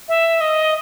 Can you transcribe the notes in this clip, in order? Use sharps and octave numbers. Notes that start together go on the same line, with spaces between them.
E5
D#5